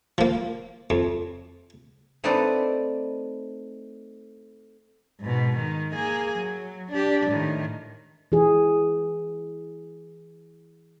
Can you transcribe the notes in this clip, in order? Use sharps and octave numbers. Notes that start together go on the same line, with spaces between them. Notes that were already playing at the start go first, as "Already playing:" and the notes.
F3 A#3
F2
A3 C4 D#4 B4 C5 D5
G#2 B2
D#3
A#3 G#4
F#3
D4 G4
A2 D#3
E3 G#4